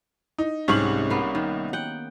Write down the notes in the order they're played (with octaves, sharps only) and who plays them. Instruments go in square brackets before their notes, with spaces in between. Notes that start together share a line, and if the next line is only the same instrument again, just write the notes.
[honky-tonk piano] D#4
[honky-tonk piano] C2 C#6 F#7 [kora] G#2 C3 C#4
[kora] A#3 B3
D#3
F#5 G5